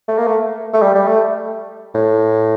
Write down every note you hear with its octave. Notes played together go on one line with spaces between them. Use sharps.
A3
A#3
A3
A3
G3
G3
A3
A2